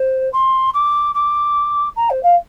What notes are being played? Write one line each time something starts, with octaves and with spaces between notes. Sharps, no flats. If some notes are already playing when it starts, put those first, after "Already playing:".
Already playing: C5
C6
D6
D6
A#5
C5
F5